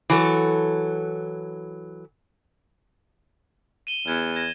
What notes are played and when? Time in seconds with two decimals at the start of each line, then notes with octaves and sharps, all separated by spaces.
0.10 E3 F#3 A4
3.87 D#7 E7 G7
4.08 E2 G#6
4.36 G#6 A#6 E7